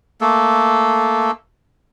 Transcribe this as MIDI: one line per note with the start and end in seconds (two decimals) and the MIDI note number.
0.21 1.31 57
0.21 1.31 58
0.21 1.31 69